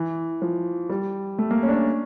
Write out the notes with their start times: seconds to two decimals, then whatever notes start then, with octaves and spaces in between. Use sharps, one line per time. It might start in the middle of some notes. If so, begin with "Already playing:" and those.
Already playing: E3
0.42 F3
0.90 G3
1.38 A3
1.51 A#3
1.63 C#4
1.68 D4
1.74 C#4